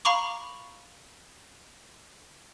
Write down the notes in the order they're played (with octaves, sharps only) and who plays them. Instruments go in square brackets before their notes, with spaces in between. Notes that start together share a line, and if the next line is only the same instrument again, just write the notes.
[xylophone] F5 A#5 B5 C#6 D6